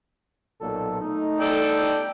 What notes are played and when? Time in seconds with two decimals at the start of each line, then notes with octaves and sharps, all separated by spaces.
0.61 B1 A#2 A4
1.02 A3 D#4
1.40 A4 D5 G5